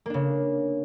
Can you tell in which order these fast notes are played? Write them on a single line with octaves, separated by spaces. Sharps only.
A#3 D4 C#3